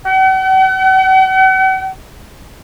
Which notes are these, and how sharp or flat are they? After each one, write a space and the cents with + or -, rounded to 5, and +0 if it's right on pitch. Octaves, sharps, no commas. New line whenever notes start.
F#5 +45